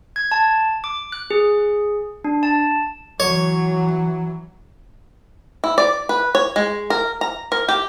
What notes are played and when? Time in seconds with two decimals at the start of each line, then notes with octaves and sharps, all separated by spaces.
0.16 G#6
0.32 A5
0.84 D6
1.12 F#6
1.31 G#4
2.24 D4
2.43 A5
3.20 E3 F#3 C#5
5.64 E4
5.78 D5
6.09 B4
6.35 C#5
6.56 G#3
6.90 A#4
7.21 A#5
7.52 A#4
7.68 G4